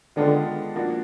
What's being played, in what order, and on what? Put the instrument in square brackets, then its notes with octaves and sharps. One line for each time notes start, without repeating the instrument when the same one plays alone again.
[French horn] D3 [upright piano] D#3 G#3 B3 D4 F4
[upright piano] A#2 F3 A#3 D4 F#4